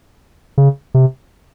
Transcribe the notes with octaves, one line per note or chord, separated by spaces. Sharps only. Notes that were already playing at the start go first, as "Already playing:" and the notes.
C#3
C3